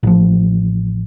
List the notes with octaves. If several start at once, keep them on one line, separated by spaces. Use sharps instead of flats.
A1 F3